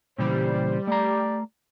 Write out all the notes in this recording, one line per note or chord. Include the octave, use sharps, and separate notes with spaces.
A#2 C#3 E3 G3 C5
A3 G4 D5 A#5